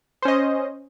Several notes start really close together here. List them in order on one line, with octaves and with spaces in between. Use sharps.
C5 C#4 D#5